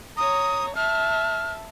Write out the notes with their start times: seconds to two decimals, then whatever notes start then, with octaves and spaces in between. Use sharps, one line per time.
0.17 C#5 A#5 D#6
0.76 E5 A5 F6